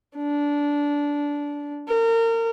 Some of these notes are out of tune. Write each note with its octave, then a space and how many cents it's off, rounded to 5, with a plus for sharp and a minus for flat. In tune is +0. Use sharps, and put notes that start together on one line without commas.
D4 -15
A#4 -30